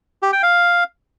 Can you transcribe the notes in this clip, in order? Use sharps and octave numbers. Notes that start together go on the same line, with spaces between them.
G4
G5
F5